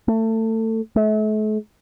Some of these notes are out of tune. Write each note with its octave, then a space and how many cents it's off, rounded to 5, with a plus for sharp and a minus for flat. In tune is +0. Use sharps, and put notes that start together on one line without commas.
A3 +25
A3 -40